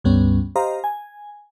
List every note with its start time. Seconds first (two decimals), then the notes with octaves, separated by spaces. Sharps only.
0.04 C#2 G2 G3 B3 C#4
0.56 G4 C5 D#5 F5 A#5
0.84 G#5